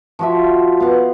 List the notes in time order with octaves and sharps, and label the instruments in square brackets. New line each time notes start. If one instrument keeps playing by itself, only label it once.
[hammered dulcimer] F3 F#4 E5
B3 F5 F#5